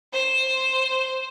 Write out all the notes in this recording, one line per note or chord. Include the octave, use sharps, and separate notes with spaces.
C5